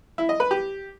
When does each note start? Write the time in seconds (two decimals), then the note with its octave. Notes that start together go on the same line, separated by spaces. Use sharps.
0.18 E4
0.29 D#5
0.40 B4
0.51 G4